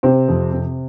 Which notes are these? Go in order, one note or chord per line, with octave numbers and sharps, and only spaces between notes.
C3 C4
F2
C3